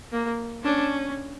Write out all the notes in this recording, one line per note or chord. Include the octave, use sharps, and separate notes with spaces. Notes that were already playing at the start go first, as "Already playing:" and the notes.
A#3
C#4 D4